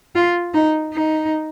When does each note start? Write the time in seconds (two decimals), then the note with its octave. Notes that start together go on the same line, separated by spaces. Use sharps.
0.15 F4
0.54 D#4
0.93 D#4